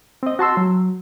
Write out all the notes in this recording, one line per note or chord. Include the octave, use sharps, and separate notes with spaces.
C4 D#5
F#4 A5 C6 E6
F#3